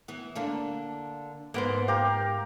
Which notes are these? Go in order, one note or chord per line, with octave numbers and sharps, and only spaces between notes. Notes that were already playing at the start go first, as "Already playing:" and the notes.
E3 B3
D3 A#3 D4
G#2 A#3 B3 C5
G4 A#4 F5